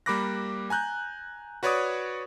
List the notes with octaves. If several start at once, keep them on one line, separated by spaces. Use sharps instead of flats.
G3 A#3 B5 D6 F#6 A#6
G#5 A#5 F#6 G6
F#4 B4 C#5 D5 C#6 D#6